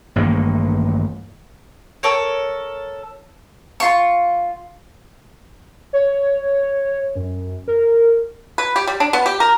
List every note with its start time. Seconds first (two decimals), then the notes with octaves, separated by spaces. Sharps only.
0.16 A1 G2 D#3 A#3
2.03 A4 A#4 C#5
3.80 F4 C#6
5.93 C#5
7.15 F#2
7.68 A#4
8.58 B4
8.76 G4
8.87 G3
9.00 D4
9.13 B3
9.26 G4
9.40 A#4